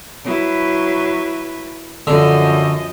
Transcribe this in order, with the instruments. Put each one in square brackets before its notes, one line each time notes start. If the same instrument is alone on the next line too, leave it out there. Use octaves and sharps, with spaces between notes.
[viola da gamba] F#3 E4 B4
[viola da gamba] F#2 F3 D#5 [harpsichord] D3